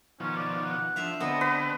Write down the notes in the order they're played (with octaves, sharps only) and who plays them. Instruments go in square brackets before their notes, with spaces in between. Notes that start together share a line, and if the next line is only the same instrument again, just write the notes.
[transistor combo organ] B2 D#3 F3 [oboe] C#4
[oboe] D5
F#5
[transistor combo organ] F3 [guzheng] D4 E5 F5
[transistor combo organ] D3 C4 [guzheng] B3 [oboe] D#5
[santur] B4